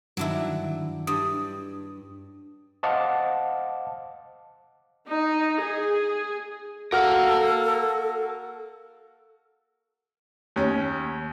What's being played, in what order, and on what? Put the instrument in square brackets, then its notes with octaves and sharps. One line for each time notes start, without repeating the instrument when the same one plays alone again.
[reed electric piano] G2 D#3 [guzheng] F#3 D4 E4
[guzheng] G2 [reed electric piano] D#6
[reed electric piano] C5 D#5 F5 F#5 A5 D6
[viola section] D#4
G#4
[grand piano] F#4 F6 [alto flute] A4 [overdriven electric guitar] A#4 F5
[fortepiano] D#2 C#4